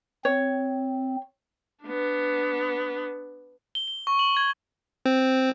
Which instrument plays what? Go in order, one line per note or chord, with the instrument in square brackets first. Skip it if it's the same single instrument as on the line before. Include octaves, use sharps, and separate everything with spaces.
[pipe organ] C4 [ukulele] C#5
[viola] B3 D4
[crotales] G7
G7
C#6
F#7
G#6
[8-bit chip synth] C4